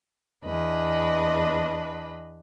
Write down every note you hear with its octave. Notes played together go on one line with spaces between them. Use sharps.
E2 D4 B4 D#5